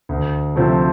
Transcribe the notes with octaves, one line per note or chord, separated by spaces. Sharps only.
D2
C3 F3 A3 C4